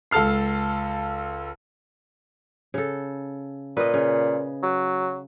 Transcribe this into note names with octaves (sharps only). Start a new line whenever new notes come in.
C#2 A4 A5 F6 C7
C#3 A4
A#2 B4 D#5
C#3
F#3